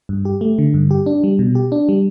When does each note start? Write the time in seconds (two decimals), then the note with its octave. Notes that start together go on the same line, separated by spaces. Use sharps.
0.09 G2
0.25 G4
0.41 A3
0.58 D3
0.74 G2
0.91 G4
1.06 D4
1.24 G3
1.39 B2
1.55 G4
1.72 D4
1.89 G3